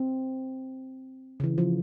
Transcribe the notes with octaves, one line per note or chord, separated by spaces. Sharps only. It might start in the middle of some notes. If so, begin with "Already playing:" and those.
Already playing: C4
C#3
E3
F3